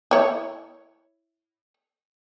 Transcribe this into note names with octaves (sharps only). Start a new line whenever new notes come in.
E4 C#5